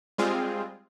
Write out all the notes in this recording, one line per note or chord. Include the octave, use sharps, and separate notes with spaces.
G3 G#3 C4 F4 G#4